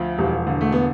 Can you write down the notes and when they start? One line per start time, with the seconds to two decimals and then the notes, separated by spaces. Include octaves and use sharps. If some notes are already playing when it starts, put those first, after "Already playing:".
Already playing: D2 F3
0.18 E1 G3
0.47 D3
0.61 A3
0.72 B3